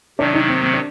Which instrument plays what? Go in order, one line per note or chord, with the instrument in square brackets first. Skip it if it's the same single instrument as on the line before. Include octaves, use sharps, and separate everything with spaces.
[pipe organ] C3 D#3 F#3 [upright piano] D4
[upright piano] D#4
C4
C4
D4